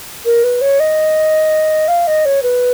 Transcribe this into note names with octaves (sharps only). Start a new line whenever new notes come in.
A#4
B4
C#5
D#5
F5
D#5
C#5
B4